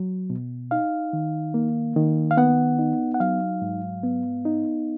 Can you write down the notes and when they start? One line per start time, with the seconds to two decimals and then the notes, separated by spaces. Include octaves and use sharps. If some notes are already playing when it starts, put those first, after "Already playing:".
Already playing: F#3
0.30 B2
0.71 D#4 F5
1.13 D#3
1.54 A#3
1.96 D#3
2.31 F5
2.37 B3 F#5
2.79 D#4
3.14 F#5
3.20 F#3 F5
3.62 G#2
4.03 B3
4.45 D#4